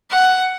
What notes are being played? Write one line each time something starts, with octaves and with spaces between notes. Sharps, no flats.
F#5